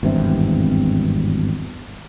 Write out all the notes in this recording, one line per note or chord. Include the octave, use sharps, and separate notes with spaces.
G#1 E2 G2 C3